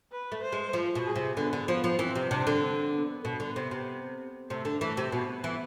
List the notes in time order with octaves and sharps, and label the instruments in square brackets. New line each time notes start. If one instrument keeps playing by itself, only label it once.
[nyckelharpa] B4
[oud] A3
[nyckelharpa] C5
[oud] G#3
F3
B2
[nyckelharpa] G#4
[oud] C3
[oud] D3 [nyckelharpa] B3
[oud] D3
[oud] F3 [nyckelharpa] B3
[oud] F3
[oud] E3 [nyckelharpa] C4
[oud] C3
[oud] C3 [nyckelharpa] D4
[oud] D3
[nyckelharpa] C4
B3
[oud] B2
D3
C3
C3
[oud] C3 [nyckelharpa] A3
[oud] D3
[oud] E3 [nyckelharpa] A3
[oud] C3
[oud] B2 [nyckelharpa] B3
[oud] E3